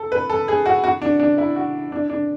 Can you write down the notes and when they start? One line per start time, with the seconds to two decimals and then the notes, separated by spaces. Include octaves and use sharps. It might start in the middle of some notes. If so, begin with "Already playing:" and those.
Already playing: A4
0.12 B4
0.30 A4
0.48 G#4
0.66 F#4
0.84 F#4
1.02 D4
1.20 D4
1.38 E4
1.56 F#4
1.92 D4
2.10 D4